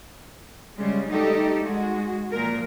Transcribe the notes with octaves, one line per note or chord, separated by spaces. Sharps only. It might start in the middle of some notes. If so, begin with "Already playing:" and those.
C#3 G3 G#3
G3 A3 D#4 G4 A4
G#3 F#4
A#2 F3 A#4